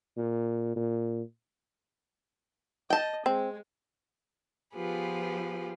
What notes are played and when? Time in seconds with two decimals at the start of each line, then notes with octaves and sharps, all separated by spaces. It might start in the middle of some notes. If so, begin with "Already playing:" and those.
0.17 A#2
0.76 A#2
2.90 D#5 G5 A5
3.26 G#3 C4
4.75 F3 B3 F4 G4 G#4 B4